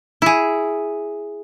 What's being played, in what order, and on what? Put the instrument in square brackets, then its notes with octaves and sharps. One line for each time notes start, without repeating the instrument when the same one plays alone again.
[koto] E4 G#4